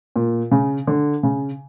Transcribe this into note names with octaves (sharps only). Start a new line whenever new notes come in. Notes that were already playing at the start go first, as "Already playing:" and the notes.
A#2
C#3
D3
C#3